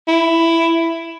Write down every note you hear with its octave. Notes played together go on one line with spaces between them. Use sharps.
E4